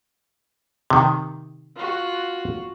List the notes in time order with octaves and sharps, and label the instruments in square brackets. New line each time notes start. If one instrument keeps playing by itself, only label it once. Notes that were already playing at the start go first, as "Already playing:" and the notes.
[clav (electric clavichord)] C3 D#3
[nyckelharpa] F4 F#4